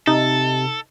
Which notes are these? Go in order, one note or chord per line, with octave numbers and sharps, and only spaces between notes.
C3 D#4 A4